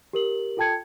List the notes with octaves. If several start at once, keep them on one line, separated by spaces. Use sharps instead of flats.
G4 A#4 F#7
F4 A4 G5 A5 G#6 C#7